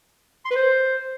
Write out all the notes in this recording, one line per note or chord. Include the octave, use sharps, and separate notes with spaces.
C6
B4
C5